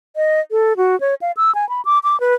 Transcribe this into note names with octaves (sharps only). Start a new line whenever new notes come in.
D#5
A4
F#4
C#5
F5
E6
G#5
B5
D6
D6
B4